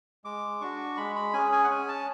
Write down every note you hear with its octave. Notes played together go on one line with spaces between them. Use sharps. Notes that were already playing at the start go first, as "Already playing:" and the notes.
G#3 D6
D4 F#4 C#6
G#3 B5
B5
C#4 G#4 G#5
G#5
F#5
C#4 G#5
A5